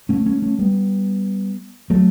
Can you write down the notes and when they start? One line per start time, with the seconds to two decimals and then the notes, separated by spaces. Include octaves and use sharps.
0.09 A3 C#4
0.26 A3 C#4
0.42 A3 C#4
0.59 G3 B3
1.90 F#3 A3